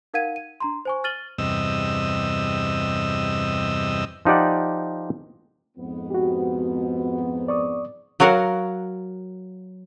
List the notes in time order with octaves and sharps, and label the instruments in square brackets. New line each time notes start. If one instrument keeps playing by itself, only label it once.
[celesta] D#4 A#4 F5 F#5 G#6 D#7
D#7
D4 A#5 C6
C5 G#5 C#6
F6 A6 D#7 F#7 G7
[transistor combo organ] E2 G2 C3 D#5 E6
[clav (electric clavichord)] F3 D#4 G4 D5 F#5
[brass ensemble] F2 G#2 B3
[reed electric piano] F#4 G4
D5 C#6 D#6
[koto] F#3 F#4 A#4 F5 F#5